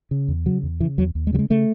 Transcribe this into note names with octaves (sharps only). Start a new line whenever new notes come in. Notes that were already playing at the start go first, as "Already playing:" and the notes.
C#3
E2
C#3 F#3
E2
C#3 E3
E2 F#3
D#2
G#3
C#3 F#3
G#3
C#3 A3